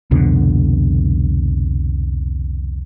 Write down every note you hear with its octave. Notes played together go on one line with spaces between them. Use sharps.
C2 F2 B2 D3